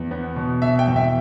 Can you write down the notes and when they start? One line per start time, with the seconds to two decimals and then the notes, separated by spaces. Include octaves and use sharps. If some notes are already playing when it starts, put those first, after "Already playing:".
Already playing: E2
0.11 B3
0.36 B2
0.62 B2 E5
0.79 G5
0.88 E2
0.96 E5